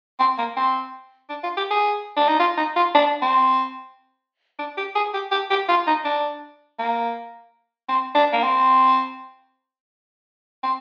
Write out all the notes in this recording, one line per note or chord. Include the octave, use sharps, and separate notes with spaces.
C4
A#3
C4
D4
F4
G4
G#4
D4
D#4
F4
D#4
F4
D4
C4
D4
G4
G#4
G4
G4
G4
F4
D#4
D4
A#3
C4
D4
A#3
C4
C4